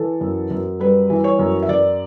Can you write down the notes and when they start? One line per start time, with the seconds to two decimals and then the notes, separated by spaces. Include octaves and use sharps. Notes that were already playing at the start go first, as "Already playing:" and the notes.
Already playing: E3 A4
0.21 F#2
0.51 F#2
0.79 G3 B4
1.10 E3
1.24 C#5
1.39 F#2
1.62 E5
1.69 F#2 D5